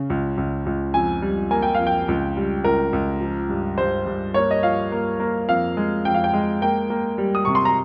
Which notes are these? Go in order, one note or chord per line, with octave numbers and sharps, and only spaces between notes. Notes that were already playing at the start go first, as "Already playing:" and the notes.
Already playing: C#3
C#2
C#2
C#2
F2 G#5
G3
A#3 G#5
G5
F5
F2
G5
C#2
G3
C#2 A#4
C#2
F3
G2
G2 C5
G2
A#3 C#5
D#5
F3 F5
A#3
A#3
F2 F5
G#3
F2 G5
F5
G5
G#3
A#3 G5
A#3
G3
D#6
C3 C#6
C6
A#5